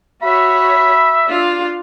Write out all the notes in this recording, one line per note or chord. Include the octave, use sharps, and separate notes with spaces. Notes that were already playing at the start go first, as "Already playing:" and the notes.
F#4 C#5 E5 B5
D4 F4